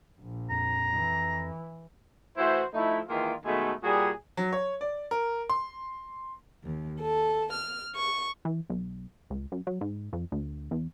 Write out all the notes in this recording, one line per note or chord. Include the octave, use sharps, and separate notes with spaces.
A#1
F2 A#5
E3
E3 A3 E4 F#4 C5
F3 A3 D#4 E4
D#3 E3 G#3 A#3 F4
B2 D#3 G#3 A3
A#2 G3 F#4 G#4
F#3
C#5
D5
A#4
C6
D#2
A4
F6
C#6
E3
B1
C#2
F#2
F#3
G#2
F2
D2
E2